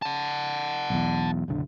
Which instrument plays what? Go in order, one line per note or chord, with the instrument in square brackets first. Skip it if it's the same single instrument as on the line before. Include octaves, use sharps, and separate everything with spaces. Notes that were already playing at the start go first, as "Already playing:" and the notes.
[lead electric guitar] F#5 A5
[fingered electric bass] B1 E2
F#1 B1 D3